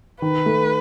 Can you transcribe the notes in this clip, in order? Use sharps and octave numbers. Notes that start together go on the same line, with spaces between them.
D#3 B4
A3